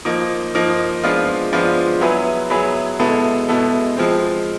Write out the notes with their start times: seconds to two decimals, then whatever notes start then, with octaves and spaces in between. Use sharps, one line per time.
0.05 F3 A#3 D#4
0.55 F3 A#3 D#4
1.04 F3 G#3 B3 D4 F4
1.52 F3 G#3 B3 D4 F4
2.01 F#3 B3 E4 G#4 B4
2.50 F#3 B3 E4 G#4 B4
2.99 B2 G#3 B3 E4 A4
3.49 B2 G#3 B3 E4 A4
3.97 F3 G#3 C4